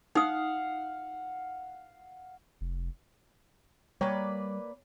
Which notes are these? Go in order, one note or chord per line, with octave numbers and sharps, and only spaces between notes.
D#4 F5 F#5 D#6
F1
G3 A#3 B4 C#5 D5 G5